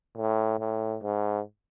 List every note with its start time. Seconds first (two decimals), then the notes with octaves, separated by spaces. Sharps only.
0.18 A2
0.60 A2
1.02 G#2